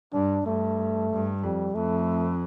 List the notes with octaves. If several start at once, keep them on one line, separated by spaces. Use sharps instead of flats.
G2 D4
G2 A3
G2
F2 G3
F2 A3